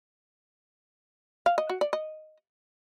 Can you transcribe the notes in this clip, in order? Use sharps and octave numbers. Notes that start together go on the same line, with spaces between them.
F5
D#5
F#4
D5
D#5